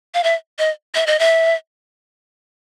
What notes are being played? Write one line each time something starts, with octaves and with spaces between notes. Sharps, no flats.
F5
E5
D#5
E5
D#5
E5